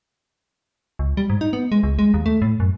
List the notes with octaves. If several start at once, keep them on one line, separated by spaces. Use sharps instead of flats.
C#2
G3
G#2
D#4
B3
G#3
C#2
G#3
D#2
A3
A2
F#2